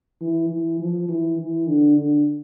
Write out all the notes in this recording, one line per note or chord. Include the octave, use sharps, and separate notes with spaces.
E3
E3
F3
E3
E3
D3
D3